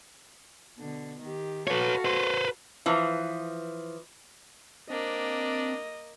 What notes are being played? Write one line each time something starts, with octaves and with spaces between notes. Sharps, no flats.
B2 D3
D#3 G4
F#4 A4 B4 C#5 F5
B4 C5
E3 F3
A#3 C4 D4 D#5